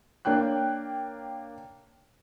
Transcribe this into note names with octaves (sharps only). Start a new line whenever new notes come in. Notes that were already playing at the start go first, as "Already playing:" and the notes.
A#3 D4 C#5 G5 F#6